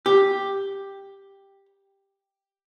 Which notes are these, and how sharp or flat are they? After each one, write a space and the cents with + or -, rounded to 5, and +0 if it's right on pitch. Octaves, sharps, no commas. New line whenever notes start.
G4 +5